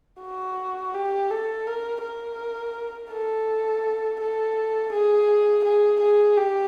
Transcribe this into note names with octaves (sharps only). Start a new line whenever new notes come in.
F#4
G4
A4
A#4
A#4
A4
A4
G#4
G#4
G#4
G4